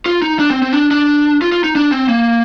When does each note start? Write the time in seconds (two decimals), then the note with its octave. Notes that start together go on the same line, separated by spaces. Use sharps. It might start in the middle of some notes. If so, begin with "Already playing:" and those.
0.06 F4
0.22 D#4
0.39 D4
0.50 C4
0.62 C4
0.73 D4
0.91 D4
1.42 F4
1.52 F4
1.64 D#4
1.76 D4
1.92 C4
2.09 A#3